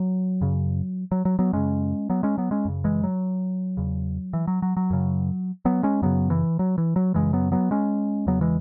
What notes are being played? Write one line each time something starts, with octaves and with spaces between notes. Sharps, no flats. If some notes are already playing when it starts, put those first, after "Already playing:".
Already playing: F#3
F#2 C#3
F#3
F#3
F#3 B3
F#2 C#3 G#3 C#4
F#3 B3
G#3 C#4
F#3 B3
G#3 C#4
F#2 C#3
E3 G#3
F#3
E2 C#3
E3
F#3
F#3
F#3
F#2 C#3
F#3 B3
G#3 C#4
F#2 C#3 F#3 B3
E3
F#3
E3
F#3
F#2 C#3 E3 G#3
F#3 B3
F#3 B3
G#3 C#4
E2 C#3 F#3 B3
E3 G#3